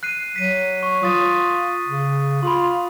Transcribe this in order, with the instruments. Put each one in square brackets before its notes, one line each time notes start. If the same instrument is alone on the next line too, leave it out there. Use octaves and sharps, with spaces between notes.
[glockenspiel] F#6 C7 D#7
[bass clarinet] F#3 [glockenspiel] B6 D#7
[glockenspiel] C#6
[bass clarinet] F4 [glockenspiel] D#6 A6 D#7
[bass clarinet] C#3
[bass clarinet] F4 [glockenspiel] B5 C6